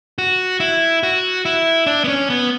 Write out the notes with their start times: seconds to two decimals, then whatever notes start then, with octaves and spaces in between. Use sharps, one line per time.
0.18 F#4
0.60 E4
1.03 F#4
1.45 E4
1.86 D4
2.04 B3
2.08 C#4
2.30 B3